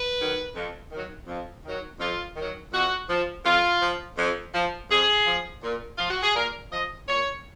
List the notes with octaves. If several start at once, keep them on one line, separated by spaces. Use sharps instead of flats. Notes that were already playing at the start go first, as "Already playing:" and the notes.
Already playing: B4
D#3 F#3
F2
D#3 F#3
F2
D#3 F#3
F2 F4
D#3 F#3
F2 F#4
F3
F2 F4
F3
F2
F3
F2 G#4
F3
A#2
F3 F4
F#4
G#4
A#2 A#4
F3 D#5
A#2 C#5